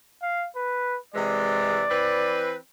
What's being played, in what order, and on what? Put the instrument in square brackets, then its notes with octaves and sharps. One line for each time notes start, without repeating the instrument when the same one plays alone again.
[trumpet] F5
B4
[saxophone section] C3 E3 G#3 [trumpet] D5
[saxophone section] E3 C4 B4